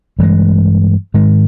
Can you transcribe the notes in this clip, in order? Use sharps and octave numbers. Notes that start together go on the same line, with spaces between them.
G2 E3 G#3
G#2 D#3 G#3